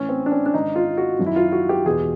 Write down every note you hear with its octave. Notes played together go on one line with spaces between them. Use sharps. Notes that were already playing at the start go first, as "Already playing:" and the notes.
Already playing: A2 E3 C#4
C4
D4
C#4
D4
G#2 D#3 D#4
F4
F#4
F#2 D#3
E4
F4
F#4
G4
E2 B2 G#4